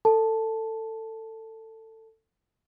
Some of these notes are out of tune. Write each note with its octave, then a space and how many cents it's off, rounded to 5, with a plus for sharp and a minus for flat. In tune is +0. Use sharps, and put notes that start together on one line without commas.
A4 +20 A5 +0